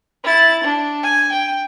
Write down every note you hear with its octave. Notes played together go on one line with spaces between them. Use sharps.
E4 A6
D4
G#5
G5